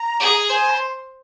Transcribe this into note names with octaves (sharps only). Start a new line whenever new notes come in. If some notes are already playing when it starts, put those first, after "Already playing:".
Already playing: A#5
G#4
C5 G#5
C6